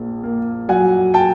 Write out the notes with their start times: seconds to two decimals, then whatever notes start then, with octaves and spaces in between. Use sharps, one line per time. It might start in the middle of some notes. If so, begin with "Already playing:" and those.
Already playing: A#1 A#2
0.23 A#3
0.69 F#3 F#5 G#5
1.14 G5 A5